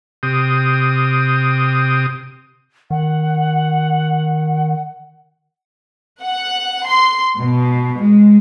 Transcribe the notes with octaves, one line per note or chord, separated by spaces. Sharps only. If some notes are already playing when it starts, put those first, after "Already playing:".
C3 G4 D#6
D#3 F#5
F#5
C6
B2
G#3